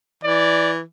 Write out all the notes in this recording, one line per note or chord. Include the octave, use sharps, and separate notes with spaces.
E3 D5